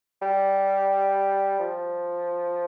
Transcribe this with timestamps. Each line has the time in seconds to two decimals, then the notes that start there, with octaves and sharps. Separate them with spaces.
0.22 G3
1.60 F3